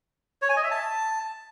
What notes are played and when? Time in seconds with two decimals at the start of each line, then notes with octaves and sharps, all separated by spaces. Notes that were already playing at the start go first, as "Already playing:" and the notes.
0.42 C#5
0.49 G#5
0.56 D#5
0.64 E5
0.71 A5